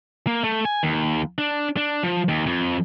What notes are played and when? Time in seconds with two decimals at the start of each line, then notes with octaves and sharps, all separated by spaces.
0.27 A#3
0.44 A3
0.65 G#5
0.83 D#2
1.38 D4
1.77 D4
2.03 F3
2.29 D#2
2.47 F2